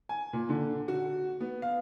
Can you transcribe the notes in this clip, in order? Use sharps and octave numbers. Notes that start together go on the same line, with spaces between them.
G#5
A#2
D3
F#4
B3
F5